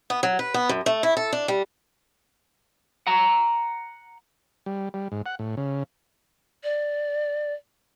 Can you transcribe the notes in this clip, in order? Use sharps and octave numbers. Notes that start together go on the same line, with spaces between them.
B3
F#3
B4
B3
F#2
A3
E4
A4
D4
G3
F#5 A#5
G3
G3
G#2
F#5
A2
C#3
D5